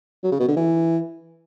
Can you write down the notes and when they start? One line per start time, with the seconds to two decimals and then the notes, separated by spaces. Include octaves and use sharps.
0.23 F#3
0.31 C#3
0.40 B2
0.48 D3
0.56 E3